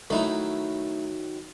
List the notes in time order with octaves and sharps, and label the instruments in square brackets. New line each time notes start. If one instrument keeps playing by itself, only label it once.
[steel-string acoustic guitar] D#3 F#3 [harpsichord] A3 D#4 E4